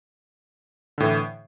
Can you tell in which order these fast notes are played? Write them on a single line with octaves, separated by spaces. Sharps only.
D3 A2 E3